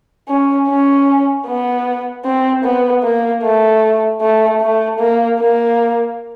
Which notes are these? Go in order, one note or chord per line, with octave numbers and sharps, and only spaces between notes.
C#4
C#4
B3
C4
B3
A#3
A3
A3
A3
A#3
A#3